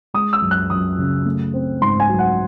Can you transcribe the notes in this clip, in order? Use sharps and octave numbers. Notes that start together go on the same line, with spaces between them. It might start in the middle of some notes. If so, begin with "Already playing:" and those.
G#3 D#6
E6
F#2
F#6
F#2 D#6
C#3
A3
C4
G#2 C6
G#5
F#3
F#5